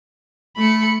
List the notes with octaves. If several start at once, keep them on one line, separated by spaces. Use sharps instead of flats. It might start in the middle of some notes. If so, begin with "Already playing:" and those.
A3 B5 C#7